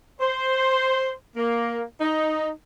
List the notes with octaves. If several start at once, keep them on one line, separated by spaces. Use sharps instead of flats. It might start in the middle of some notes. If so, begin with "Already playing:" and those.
C5
A#3
D#4